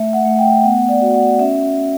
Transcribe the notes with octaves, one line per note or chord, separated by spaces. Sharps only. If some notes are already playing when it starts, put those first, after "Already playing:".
Already playing: A3 E5
F#5
A3
G5
B3 F#5
D5
F#4
F#5
C#4 E5